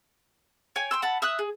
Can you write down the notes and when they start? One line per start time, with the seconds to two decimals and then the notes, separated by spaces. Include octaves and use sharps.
0.76 C#5 G5 G#5
0.91 G5 C6 E6
1.02 F#5 A5 B5
1.22 E5 D#6 E6 F#6
1.39 G#4